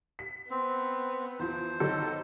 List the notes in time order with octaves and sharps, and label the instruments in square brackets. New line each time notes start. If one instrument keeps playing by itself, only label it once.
[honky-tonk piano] B6
[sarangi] B3 [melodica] C4
[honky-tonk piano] E2 F3 [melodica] C5
[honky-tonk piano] G1 F#3 A4 [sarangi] D#4